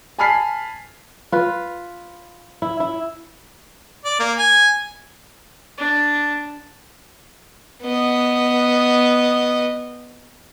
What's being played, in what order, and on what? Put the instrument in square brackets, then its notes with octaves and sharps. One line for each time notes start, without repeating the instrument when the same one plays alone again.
[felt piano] G#5 A5 B5 F6 B6 C7
[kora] F4 B4
E4
E4
[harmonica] D5
A#3
G#5
[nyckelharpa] D4
[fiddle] B3 D#5